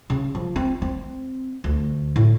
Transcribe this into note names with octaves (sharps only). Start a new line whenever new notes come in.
C#3
F3
C4
C4
D2
A2